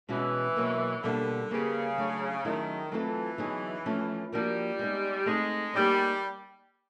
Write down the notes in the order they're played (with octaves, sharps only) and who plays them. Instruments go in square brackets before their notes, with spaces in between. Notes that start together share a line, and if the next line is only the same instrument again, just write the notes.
[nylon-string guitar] B2 G#3 C#4 F#4 [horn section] E3
[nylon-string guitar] B2 F#3 A#3
[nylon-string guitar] B2 G3 A#3 D4 [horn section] D3
[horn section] C#3 [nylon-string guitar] G3 A#3 D#4 G4 B4
[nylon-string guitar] F#3 A3 D4
[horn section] D#3 [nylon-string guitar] F#3 A3 C#4 E4 G#4
[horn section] E3 [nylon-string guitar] F#3 A3 C4 F4 A4
[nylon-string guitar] D3 F#3 B3 D#4 G#4
F3 A3 C#4
[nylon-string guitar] F3 A#3 D4 F#4 A#4 [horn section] G3
[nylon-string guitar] G#3 B3 D#4
[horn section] G#3 [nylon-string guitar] A3 C4 D#4
[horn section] G3 [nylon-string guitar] A#3 D#4 G#4 C#5